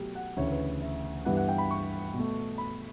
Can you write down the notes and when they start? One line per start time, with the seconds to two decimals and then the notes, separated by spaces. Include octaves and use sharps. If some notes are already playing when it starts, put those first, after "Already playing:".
Already playing: B2 F#3 A3 G4
0.15 F#5
0.37 D2 C#3 E3 C#5
0.52 B4
0.82 E5
1.25 G2 E3 G3 B3 F#5
1.37 F#5
1.48 G5
1.58 B5
1.71 C#6
2.14 B2
2.19 A3
2.58 B5